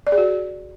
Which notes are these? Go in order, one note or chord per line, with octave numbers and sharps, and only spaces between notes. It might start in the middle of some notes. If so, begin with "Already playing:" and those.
D5
G#4
F#4